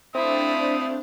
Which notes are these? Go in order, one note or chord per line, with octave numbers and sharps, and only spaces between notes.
A3 C4 D4 E4 C5 D5 F5 D#6